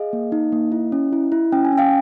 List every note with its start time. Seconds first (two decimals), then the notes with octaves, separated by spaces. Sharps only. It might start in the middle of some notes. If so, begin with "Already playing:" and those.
Already playing: G#4 D#5 F5
0.13 A#3
0.32 D#4
0.52 A#3
0.72 E4
0.92 C#4
1.13 E4
1.32 E4
1.52 C#4 G5
1.65 G#5
1.72 C#4
1.78 F5 G5